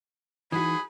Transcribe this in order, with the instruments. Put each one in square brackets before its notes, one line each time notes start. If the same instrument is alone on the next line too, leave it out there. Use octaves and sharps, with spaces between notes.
[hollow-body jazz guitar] E3 [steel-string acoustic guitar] D#4 F#4 [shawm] G#4 [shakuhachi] B5